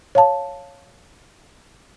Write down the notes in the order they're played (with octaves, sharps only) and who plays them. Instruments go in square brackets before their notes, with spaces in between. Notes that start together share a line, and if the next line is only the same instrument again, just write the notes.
[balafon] C#5 F5 A5